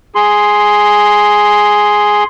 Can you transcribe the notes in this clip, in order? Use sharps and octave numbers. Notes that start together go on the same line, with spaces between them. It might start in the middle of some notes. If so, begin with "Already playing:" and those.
G#4 C6